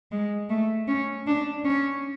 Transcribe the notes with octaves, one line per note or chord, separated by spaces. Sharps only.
G#3
A3
C#4
D4
C#4